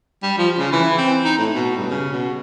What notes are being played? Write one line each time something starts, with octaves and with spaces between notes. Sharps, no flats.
G3
F3
C#3
E3
C4
D#4
A2
B2
G2
C#3
B2